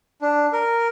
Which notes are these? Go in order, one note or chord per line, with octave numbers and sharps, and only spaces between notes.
D4
A#4